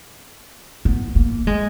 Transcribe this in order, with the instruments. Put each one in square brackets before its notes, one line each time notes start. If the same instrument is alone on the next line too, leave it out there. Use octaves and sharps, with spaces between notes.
[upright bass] B3
A#3
G#3